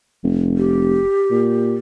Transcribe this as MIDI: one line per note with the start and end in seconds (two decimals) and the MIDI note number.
0.24 1.01 29
0.57 1.75 67
1.31 1.79 46